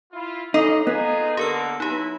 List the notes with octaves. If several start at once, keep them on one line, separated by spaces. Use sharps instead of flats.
E4 F4
C#3 D#4 A4 D#5
B3 D#4 F4 G#4
D3 A#3 G4 A#4 E6
F#3 D#4 E4 G4